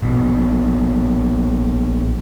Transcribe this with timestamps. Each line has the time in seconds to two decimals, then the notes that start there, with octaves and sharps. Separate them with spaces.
0.02 A#1 B2